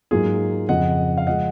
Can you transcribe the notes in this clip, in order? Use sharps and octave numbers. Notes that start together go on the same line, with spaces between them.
G#2 F#3 A#3 F4 G#4
F2 C#3 F3 D#5 F#5
F5
F3 G#3 D#5 F#5